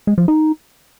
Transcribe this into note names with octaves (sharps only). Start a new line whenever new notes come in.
G#3
F3
D#4